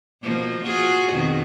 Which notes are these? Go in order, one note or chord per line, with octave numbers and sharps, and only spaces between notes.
B2 F3 A#3
F4 F#4 G#4
F2 B2 D#3